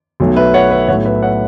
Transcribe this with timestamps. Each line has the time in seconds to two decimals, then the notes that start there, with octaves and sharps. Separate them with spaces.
0.20 B1 B2 F#3 A3
0.36 B4 E5
0.54 C#5 F#5
0.71 B4 E5
0.88 B1 A2 F#3 A3 C#5 F#5
1.05 B4 E5
1.23 C#5 F#5